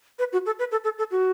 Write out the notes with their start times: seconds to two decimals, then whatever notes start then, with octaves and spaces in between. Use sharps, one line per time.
0.19 B4
0.33 F#4
0.46 A4
0.59 B4
0.72 A4
0.84 A4
0.98 A4
1.11 F#4